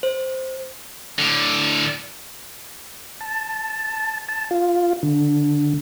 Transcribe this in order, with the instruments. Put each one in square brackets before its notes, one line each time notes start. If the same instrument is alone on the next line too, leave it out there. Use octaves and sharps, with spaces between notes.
[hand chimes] C5
[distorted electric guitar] A2 D3
[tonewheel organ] A5
A5
F4
D3